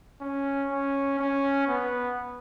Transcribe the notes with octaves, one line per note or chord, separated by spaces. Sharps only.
C#4
C#4
C#4
B3